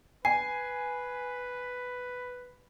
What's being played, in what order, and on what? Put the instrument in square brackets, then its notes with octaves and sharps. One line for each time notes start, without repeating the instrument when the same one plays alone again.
[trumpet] B4 [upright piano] G#5 [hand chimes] C7